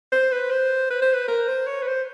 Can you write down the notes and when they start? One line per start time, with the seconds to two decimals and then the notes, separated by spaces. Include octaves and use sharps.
0.12 C5
0.32 B4
0.51 C5
0.90 B4
1.02 C5
1.13 B4
1.28 A#4
1.48 C5
1.67 C#5
1.82 B4
1.87 C5